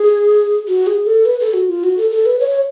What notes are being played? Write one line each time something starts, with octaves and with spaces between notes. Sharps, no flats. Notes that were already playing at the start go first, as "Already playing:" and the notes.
Already playing: G#4
F#4
G#4
A4
B4
A4
F#4
F4
F#4
A4
A4
B4
C#5